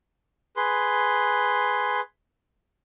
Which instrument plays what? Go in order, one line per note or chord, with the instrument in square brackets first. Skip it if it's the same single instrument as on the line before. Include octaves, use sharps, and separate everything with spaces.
[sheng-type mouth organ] G#4 B4 C6